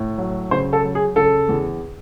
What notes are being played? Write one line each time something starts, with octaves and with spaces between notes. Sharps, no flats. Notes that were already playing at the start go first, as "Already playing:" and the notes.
Already playing: A2
F#3
C#3 C5
A4
F#3
G#4
C#3 A4
E2